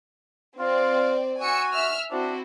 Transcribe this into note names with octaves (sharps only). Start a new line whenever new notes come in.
C4 F4 D5
F#4 G#5 E6 C#7
E5 E6 F6
C4 D4 E4 F#4